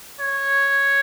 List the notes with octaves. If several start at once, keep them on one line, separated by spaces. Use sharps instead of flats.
C#5